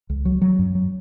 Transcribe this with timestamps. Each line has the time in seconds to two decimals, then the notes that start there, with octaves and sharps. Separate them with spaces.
0.10 C#2
0.25 F#3
0.41 F#3
0.59 F#2
0.75 F#3